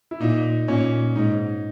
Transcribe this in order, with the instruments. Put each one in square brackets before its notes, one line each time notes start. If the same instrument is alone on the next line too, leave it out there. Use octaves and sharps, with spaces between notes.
[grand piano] E4
[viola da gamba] A#2 [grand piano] D#4
[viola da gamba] A#2 [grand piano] C#4
[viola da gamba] G#2 [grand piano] D#4